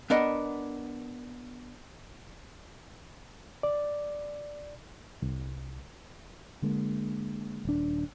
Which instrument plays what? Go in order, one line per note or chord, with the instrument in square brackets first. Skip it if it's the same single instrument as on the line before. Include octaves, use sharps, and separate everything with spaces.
[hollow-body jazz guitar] B3 D4 A#4 D#5 F#5
[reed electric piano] D5
C2
[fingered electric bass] D3 G#3 A#3
D#1 D4